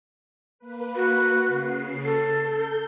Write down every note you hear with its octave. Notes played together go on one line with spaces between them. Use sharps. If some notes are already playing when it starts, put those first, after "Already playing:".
A#3 B4
F#4
C#3 C7
A4
G6